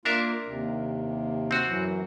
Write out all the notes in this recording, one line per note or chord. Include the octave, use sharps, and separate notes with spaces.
A#3 D4 F4 A#4 E5
D#2 C3
C4 F#4
F#2 E3 F#3